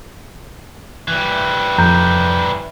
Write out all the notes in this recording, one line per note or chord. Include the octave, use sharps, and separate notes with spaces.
E3 G3
F2 A#5 G6